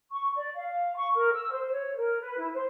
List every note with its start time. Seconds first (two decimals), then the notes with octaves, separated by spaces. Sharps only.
0.12 C#6
0.37 D5
0.56 F5
0.96 C#6
1.16 A#4
1.33 E6
1.51 C5
1.72 C#5
1.97 A#4
2.21 B4
2.38 E4
2.54 C5